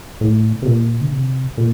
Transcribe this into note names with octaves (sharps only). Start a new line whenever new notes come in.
A2
C3
A#2
D3
C3
A#2